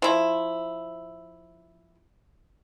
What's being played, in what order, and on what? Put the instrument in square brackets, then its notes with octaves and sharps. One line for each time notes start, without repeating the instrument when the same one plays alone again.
[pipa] F3 E4